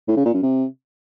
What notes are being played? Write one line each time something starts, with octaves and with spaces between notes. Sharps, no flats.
A2
C#3
A#2
F#2
C3